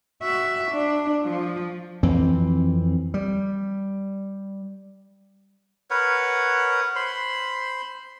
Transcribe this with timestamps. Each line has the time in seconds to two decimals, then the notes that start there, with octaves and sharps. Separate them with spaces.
0.23 F#4 E5
0.72 D4
1.25 F3
2.03 F2 E3 C4
3.14 G3
5.90 A#4 B4 C#5 F#5
6.96 C5 B5 C6